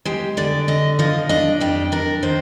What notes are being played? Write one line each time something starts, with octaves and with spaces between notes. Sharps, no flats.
G#3 G4
D3 D5
D3 D#5
F3 D#5
D4 D#5
F2 G4
D4 A#4
D#3 C5